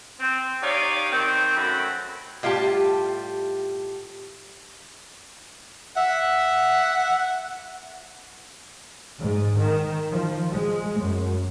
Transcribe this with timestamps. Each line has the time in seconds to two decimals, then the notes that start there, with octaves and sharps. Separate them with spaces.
0.20 C4
0.62 D#4 G4 C#5 D5 F5
1.12 D#3 C4
1.55 F#2 A3 C4 F#4 B5
2.43 A2 G3 F4 G4 A5
5.96 E5 F#5
9.21 G#2
9.58 D#3
10.11 F3
10.52 G#3
10.98 F#2